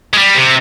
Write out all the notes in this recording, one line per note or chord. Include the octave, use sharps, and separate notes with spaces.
G#3
G3
C3